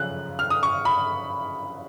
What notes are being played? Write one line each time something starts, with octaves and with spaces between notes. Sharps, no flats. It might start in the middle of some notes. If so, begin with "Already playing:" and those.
Already playing: F#2 C#3 F3 F#6
F6
D#6
C#6
B5